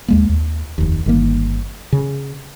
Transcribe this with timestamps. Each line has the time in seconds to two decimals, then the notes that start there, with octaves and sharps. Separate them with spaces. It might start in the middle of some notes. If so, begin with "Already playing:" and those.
0.08 D#2 G#3 A#3
0.29 D#2
0.78 F1 D#2
1.06 G1 D#3 A#3
1.92 C#3